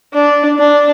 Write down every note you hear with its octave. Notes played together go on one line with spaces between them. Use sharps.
D4
D4